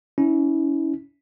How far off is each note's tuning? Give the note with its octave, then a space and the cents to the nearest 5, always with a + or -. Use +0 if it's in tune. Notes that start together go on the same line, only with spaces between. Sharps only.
C#4 +20 E4 -25